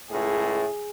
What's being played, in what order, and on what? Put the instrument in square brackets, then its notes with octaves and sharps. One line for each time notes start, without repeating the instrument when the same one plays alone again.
[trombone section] C#2 A2 [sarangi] G#4